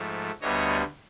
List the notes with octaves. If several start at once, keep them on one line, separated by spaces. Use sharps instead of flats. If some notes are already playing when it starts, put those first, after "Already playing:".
Already playing: G#2 F3 A3
D2 D3 G3 B3 C#5 D#5